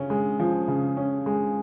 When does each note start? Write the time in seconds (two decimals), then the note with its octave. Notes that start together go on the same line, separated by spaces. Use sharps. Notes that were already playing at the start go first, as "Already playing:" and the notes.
Already playing: C#3 C#4
0.10 G#3
0.40 F3
0.68 C#3
0.97 C#4
1.26 G#3